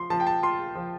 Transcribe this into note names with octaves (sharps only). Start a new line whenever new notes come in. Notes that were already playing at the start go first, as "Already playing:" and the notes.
Already playing: F3 C6
F3 A5
G5
A5
F4 C6
F3